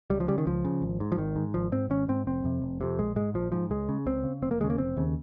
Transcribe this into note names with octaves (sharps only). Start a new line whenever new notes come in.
C#2 G3
F3
C#3 G3
D#3
C#2 F3
C#3
G#1
G#2
F3
G#1 D#3
G#2
G#1 F3
G#2 C4
G#1 C#4
G#2 C4
F1 C4
F2 C3
F1
F2 C3
A#1 G#3
G#2 G#3
A#1 F3
G#2 F3
C#2 G#3
C#3
C#2 C4
C#3
F1 C4
A#3
D#2 C#3 G#3
A#3
F1 C4
D#2 C#3